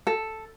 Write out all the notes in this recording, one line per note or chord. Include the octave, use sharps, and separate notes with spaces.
A4